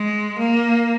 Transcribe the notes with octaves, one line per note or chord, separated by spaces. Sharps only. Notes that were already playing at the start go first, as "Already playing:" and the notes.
Already playing: G#3
A#3